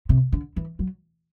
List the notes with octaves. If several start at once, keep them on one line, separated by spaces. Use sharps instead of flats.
C3
D3
E3
F#3